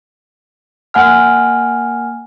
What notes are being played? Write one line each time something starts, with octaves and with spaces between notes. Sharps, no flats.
A#3 F#5 G#5 F6